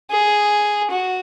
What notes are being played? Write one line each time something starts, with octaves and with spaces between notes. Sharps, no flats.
G#4
F#4